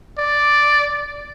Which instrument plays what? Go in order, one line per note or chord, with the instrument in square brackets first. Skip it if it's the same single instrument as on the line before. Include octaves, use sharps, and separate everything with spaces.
[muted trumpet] D5